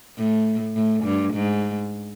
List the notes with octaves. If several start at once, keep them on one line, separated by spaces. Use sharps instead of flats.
A2
A2
G2
G#2